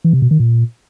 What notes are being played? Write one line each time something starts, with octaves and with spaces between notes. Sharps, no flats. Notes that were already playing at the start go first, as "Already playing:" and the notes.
E3
C3
B2
D#3
A#2